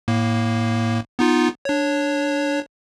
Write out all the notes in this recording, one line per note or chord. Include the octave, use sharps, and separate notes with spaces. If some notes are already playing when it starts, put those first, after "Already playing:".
A2 A#3
B3 D#4 F4
D4 C#5